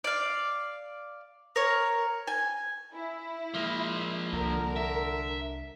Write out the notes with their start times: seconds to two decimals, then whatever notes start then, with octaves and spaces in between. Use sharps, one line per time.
0.04 D5 F5
1.56 A#4 C#5
2.28 G#5
2.95 E4
3.54 F3 G#3 A#3
4.33 C2 D3 A#4
4.76 E5